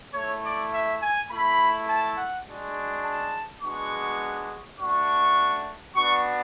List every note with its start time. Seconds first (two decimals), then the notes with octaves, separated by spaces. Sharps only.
0.13 A3 E4 C#5
0.42 D5
0.72 E5
1.00 G#5
1.30 A3 E4 B5
1.88 A5
2.17 F#5
2.47 G#3 D4 F#4
3.04 A5
3.62 G#3 B3 D4 F#4 C#6
4.79 A3 D4 F#4 C#6
5.95 B3 D4 F#4 C#6